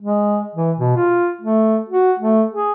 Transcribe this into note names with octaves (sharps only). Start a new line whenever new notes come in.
G#3
E3
B2
F4
A3
F#4
A3
G#4